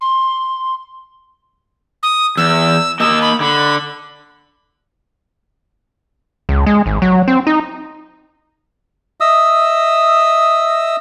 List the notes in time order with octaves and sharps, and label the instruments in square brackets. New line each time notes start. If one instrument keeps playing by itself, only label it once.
[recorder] C6
D#6
[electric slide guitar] E2 [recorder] E6
[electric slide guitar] A#3 D#5 [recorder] E6
[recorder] B5
[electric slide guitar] D3 [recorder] B5
[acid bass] C#2
G#3
G#1
F#3
C4
D#4
[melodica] D#5 E5 D#6 E6